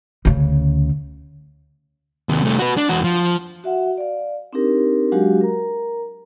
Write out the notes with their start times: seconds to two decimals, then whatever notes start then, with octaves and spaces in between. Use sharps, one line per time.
0.25 D2 C#3
2.29 D#2 C3
2.42 C2 A3
2.59 F#4 B4
2.77 D4
2.89 E2 F#4
3.04 F3
3.64 F#4 E5 F#5
3.98 D5 F5
4.53 C4 D4 D#4 G4 A#4
5.12 F#3 G#3 D4 F#4 G4 F5
5.41 A#4 A#5